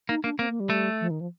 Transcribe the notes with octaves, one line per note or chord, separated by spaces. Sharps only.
A#3 D#4
A#3 D4
A#3 C4
A#3
G3
A3
F3
D#3
F3